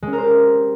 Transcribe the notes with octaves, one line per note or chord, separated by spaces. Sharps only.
G#3
C#4
A#4
C5
G4